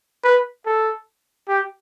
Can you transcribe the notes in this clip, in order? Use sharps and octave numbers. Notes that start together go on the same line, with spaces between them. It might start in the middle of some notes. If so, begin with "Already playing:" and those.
B4
A4
G4